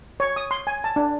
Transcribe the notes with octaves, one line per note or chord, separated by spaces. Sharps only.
C#5
D#6
C6
G#5
A5
D4